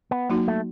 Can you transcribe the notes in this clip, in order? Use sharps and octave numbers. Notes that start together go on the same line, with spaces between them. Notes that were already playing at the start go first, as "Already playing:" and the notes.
B3
F#3 A#3 D#4 F#4
A3